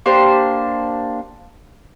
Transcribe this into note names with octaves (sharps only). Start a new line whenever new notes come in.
A#3 D4 G4 C5